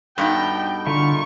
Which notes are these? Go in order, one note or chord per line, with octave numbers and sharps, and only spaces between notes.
G2 B2 D#4 A4 G5
D3 E4 F4 A#4 C#6